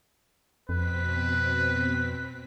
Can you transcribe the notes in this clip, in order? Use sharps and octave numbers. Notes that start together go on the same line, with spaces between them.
F2 B2 C4 B4 B6